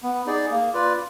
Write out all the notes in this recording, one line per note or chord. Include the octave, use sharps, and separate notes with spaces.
B3
D#4 G#4 D5
A#3
F4 B4 D5